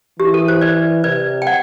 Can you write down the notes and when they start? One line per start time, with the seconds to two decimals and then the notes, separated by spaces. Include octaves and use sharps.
0.19 E3 G4
0.34 A4
0.48 C5
0.61 B4 D5
1.04 C3 B4 D5
1.42 G5
1.47 D5 F#5